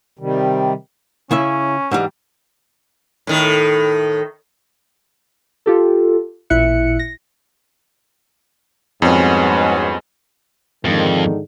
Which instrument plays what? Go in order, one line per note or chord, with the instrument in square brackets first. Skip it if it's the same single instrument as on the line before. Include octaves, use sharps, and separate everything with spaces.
[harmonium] C3 D#3 G3
[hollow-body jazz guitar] C#3 E4 E5 [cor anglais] C#4
[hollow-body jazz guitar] G#2 E3 G3
[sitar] A2 D#3
[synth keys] F4 G4 A4
A1 A#2 E4 E5 F#6 C#7
A#6
[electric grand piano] F2 [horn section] G#2 C#4 F#4 [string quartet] G3 G#3 B3
[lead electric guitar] F2 [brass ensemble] G#2 D3 D#3